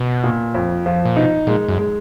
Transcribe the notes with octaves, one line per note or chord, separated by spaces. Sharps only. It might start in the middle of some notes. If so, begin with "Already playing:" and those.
Already playing: B2
A#2
F2
F3
A#2
B2 D#4
A#2 G#3
F#2
G#3